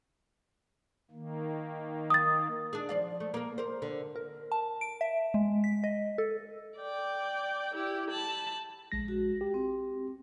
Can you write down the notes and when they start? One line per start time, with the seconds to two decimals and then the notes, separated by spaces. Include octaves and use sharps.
1.11 D#3 A#3
2.10 D#6 A6
2.73 D4 G#4
2.89 F3 D5 F5
3.20 A3
3.34 A#3 A#4
3.58 A#4 C5
3.82 D3
4.16 A#4
4.52 A5
4.81 D7
5.01 E5
5.34 G#3
5.64 B6
5.84 D#5
6.18 A4
6.78 D5 G5
7.74 E4 G4
8.10 A5 B5
8.92 A#1 G#3 A#6
9.08 F#4
9.41 G4
9.54 C4